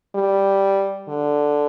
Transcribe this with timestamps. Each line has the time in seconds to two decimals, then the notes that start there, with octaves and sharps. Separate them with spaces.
0.16 G3
1.09 D3